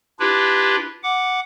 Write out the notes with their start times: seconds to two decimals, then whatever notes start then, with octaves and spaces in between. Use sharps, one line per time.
0.19 D4 E4 F4 G4 B4
1.03 F#5 D6